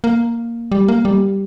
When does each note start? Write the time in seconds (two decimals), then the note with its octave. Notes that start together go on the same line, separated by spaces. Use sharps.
0.04 A#3
0.72 G3
0.88 A#3
1.05 G3